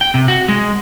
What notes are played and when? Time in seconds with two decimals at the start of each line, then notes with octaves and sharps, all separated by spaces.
0.01 G5
0.14 C3
0.28 F#4
0.48 G#3